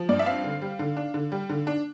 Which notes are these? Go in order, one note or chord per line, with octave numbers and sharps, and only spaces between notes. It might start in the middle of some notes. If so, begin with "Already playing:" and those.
Already playing: F3
G2 D5
E5
C4 F5
D3
G3
D3
D4
D3
G3
D3
D4